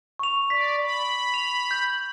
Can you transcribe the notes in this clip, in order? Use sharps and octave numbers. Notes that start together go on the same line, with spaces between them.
C#6 F7
D5 B6
B5
F7
G6